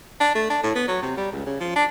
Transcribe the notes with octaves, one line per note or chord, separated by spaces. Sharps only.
D4
A3
D4
A2
B3
F#3
C3
G3
C#2
C#3
F3
D4